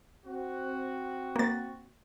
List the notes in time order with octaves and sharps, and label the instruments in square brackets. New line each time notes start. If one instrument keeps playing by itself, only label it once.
[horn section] C4 F#4
[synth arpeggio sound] A#3 A6